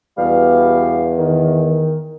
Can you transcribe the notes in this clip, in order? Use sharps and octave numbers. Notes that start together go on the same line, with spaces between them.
E2 B2 G3 F5
D#3